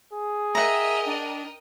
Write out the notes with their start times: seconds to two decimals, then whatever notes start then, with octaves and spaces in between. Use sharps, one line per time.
0.13 G#4
0.55 A#4 D#5 E5 F#5 G5 A#5
1.06 D4